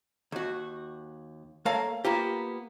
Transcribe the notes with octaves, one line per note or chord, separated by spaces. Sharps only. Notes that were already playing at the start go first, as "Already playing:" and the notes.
D#2 F#4
A3 A#3 A#4 C#5 F5 A5
A#3 B3 F4 G4